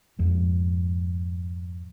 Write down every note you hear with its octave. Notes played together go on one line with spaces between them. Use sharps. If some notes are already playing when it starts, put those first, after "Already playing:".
F2 G#2